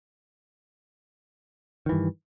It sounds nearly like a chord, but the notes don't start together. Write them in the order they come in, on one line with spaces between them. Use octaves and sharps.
D#3 E3 G2